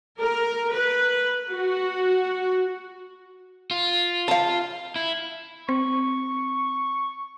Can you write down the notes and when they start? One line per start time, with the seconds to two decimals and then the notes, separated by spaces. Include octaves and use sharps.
0.20 A#4
0.73 B4
1.51 F#4
3.71 F4
4.28 F5 A5
4.96 E4
5.69 C4 C#6